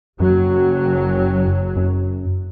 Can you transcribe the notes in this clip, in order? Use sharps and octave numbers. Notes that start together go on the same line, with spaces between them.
F#1 F#2 F#3
F#2